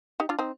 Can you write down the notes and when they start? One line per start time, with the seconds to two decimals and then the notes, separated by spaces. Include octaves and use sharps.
0.20 D#4 G4
0.29 D4 F4
0.39 C4 D#4